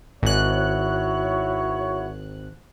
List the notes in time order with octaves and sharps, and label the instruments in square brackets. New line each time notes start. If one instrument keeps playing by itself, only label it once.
[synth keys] G#1 F#6 [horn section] E4 F#4 C#5